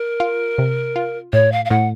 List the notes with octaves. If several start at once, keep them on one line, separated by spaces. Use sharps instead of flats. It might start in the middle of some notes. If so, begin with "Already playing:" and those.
Already playing: A#4
F4
C3
F4
A2 C#5
F5
F5
A2 F#5